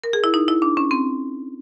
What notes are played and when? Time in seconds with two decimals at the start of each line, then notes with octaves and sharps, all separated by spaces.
0.04 A#4
0.13 G#4
0.24 E4
0.34 D#4
0.48 E4
0.62 D4
0.77 C#4
0.91 C4